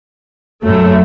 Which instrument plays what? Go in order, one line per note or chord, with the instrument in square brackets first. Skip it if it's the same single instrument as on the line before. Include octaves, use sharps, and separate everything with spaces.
[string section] F#2 F#3 A3